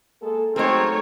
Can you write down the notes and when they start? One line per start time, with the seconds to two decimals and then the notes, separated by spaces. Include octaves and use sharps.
0.22 G#3 A#3 A4
0.56 F#3 G#3 A3 C4 D#4 A#4 C#5